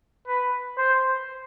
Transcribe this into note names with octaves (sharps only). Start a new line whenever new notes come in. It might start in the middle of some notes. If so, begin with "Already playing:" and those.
B4
C5